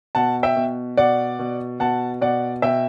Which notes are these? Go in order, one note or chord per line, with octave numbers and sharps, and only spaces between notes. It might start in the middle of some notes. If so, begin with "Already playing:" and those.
B2 F#5 A5
E5 G5
B2
B2 D5 F#5
B2
B2 F#5 A5
B2 D5 F#5
B2 E5 G5